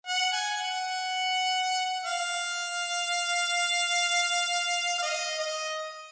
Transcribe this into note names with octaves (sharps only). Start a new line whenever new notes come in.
F#5
G#5
F#5
F5
F5
D#5
D#5